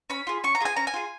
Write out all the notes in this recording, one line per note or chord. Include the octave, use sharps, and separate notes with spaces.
C#4 B5
F4 G#4
C#4 C#6
A#5
F4 G#4 G#5
C#4 A#5
G#5
F4 G#4